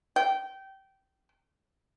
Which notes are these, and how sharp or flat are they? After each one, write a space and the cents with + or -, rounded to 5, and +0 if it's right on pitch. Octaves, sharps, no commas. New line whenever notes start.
G5 -20